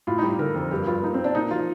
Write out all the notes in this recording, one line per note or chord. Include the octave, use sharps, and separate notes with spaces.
A2 F4
D#4
G3
D3 A#4
F2
G2 G4
G2 F4
A#3 D#4
C4
A#3
D4
A#2 D#4
F3 F4